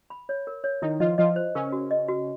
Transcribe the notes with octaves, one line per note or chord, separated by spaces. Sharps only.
B5
C#5
A#4
C#5
D#3 D#4 E4
F3 F4 D#5
F3 F4 D#5
C5
C#3 C#4 A#4
F#4
D#5
F#4